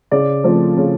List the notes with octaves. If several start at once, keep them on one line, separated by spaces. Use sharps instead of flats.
C#3 D5
F3 A3 C4
C#3